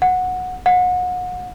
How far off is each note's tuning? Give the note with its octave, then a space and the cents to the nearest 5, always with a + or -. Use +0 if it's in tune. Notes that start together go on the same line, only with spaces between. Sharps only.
F#5 -15
F#5 -35